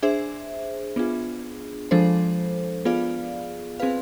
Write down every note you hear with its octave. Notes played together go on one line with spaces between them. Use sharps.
D4 G#4 C5 E5
B3 D4 F4 G#4
F3 G#3 D4 A4 C5
B3 F4 G#4 D5 F5
C4 G#4 B4 F5